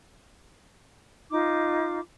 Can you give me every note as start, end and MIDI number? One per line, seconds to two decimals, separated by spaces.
1.31 2.00 63
1.31 2.00 65
1.31 2.00 86